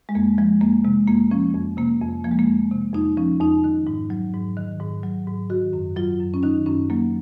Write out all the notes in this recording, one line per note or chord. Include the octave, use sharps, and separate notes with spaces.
G#3
F2 A#3
F3 G#3
F2 A#3
C3 G#3
F2 A#3
F3 C#4
F2
C3 A#3
F2
F3 A#3
G#3
A#3
F2
C3
F2 D#4
F3 C#4
F2 D#4
D#3
G#2
F#3
G#2
D#3
G#2
F#3
G#2
D#3 F#4
F#2
F#3 F4
F#2
C#4
D#3 D#4
F#2 C#4
F#3 A#3